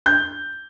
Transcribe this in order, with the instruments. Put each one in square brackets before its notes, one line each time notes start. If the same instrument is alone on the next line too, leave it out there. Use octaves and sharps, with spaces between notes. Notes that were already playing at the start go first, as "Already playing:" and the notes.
[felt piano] G6